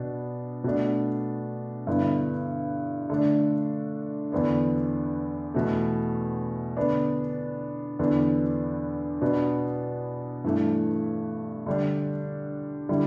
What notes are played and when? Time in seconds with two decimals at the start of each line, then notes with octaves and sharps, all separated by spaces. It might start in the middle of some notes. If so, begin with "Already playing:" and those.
Already playing: B2 B3 D4
0.64 B2 A3 D4
1.87 G2 D3 B3 E4
3.10 D3 A3 D4
4.32 E2 D3 B3 D4
5.54 E2 B2 A3
6.77 D3 B3 D4
7.99 E2 D3 B3 D4
9.22 B2 B3 D4
10.44 G2 E3 A3
11.66 D3 G3 D4
12.89 D3 G3 E4